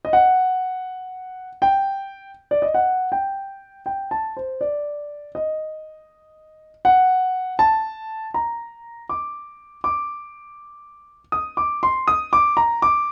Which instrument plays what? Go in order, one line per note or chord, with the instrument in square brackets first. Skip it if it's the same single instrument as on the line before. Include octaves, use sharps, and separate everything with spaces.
[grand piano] D#5
F#5
G5
D5
D#5
F#5
G5
G5
A5
C5
D5
D#5
F#5
A5
A#5
D6
D6
D#6
D6
C6
D#6
D6
A#5
D6